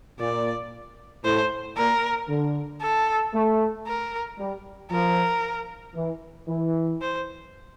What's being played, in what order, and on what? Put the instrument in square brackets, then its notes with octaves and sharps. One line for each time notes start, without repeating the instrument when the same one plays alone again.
[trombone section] A#2 [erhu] D5
[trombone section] A2 [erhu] C5
[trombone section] A#2 [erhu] A#4
[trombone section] D3
[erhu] A4
[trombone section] A3
[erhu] A#4
[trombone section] G3
[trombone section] F3 [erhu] A#4
[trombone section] E3
E3
[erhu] C5